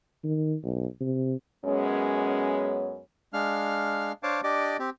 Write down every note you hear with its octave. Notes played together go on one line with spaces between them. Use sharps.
D#3
B1
C3
F#2 G#3 B3 C#4
G#3 D4 F5 F6
D4 C5 C#5 F5 A5 D6
D4 G4 D5 D#5 D6
C4 G4